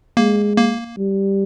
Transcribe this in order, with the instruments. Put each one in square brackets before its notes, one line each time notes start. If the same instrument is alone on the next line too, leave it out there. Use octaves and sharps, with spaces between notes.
[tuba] G#3 [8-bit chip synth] A#3
[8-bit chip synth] A#3
[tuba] G3